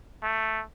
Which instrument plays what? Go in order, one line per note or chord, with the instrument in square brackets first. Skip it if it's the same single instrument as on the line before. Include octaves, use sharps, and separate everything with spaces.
[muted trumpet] A3